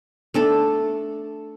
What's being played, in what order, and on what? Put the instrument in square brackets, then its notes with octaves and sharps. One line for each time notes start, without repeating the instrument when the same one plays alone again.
[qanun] A3 D4 A4